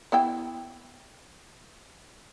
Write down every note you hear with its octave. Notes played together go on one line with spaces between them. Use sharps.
B3 E4 G5